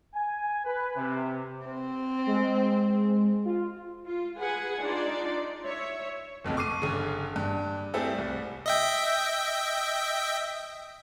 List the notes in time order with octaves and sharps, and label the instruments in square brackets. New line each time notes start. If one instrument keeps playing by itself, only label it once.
[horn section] G#5
B4
C3
[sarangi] C4
[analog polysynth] G#3
F4
[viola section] F4
G#4 B4 F#5 G#5
D4 D#4 F4 D5 C6
C#5 E5
[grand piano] F#1 B1 F2 A2
C#6 D6 C7 D#7
G1 C#3
G2
G3 A3 C4 E4 G#4 A4
C2
[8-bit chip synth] D#5 E5 G5